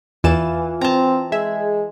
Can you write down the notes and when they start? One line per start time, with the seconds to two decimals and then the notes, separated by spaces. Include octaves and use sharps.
0.24 E2 E3 F4 A6 E7
0.81 C4 A5 A#5
1.32 G#3 G#4 E5